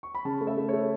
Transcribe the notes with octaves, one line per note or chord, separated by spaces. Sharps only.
C#6
B5
C#3 A5
A3
E5
A3
A3 C#5